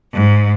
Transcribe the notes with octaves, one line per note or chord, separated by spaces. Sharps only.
G#2